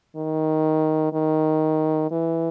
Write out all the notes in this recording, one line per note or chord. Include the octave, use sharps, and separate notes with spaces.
D#3
D#3
E3